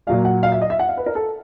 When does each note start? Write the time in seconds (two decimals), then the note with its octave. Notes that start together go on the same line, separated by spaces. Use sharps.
0.07 A#2 F#3 A#3 F5
0.25 F#5
0.43 F5
0.52 E5
0.62 D#5
0.70 E5
0.79 F#5
0.89 F5
0.97 B4
1.06 A#4
1.15 A4